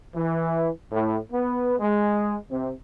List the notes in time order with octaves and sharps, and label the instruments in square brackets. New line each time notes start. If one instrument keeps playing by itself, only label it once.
[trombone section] E3
A2
B3
G#3
C3